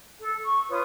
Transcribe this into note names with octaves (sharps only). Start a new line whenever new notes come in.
A4
C#6
F4 B4 C#5 D#6